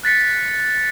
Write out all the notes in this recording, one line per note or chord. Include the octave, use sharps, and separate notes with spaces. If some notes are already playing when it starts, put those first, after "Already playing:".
F#6 A6 B6 C#7